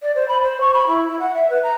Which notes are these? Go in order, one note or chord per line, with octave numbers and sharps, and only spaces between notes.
D5
C5
B5
C5
C#6
B5
E4
E4
F#5
E5
B4
A#5